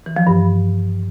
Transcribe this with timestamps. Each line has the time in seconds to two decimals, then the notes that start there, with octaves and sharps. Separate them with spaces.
0.06 E3
0.17 F3
0.27 G2